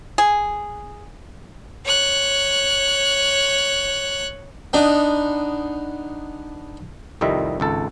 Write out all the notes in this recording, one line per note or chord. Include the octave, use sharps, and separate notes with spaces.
G#4
C#5 F#6
B3 D4 D#4
C2 F2 D#3 G3 D#5 E5
G#1 C#2 A4